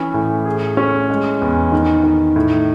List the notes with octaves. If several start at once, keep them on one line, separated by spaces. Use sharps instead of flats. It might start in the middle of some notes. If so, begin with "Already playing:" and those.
Already playing: E3 C#4
A2
G#4
C#4
G#3
E2
D#3
D#3
A2